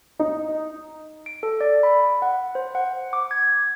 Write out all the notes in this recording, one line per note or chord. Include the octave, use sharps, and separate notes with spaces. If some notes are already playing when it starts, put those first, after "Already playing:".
D#4
D7
A4
D5
B5
F#5
C5
F#5
D6
G#6